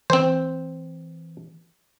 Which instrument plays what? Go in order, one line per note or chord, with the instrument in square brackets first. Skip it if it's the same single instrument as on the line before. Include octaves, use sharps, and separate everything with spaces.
[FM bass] E3 [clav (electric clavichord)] C4 C5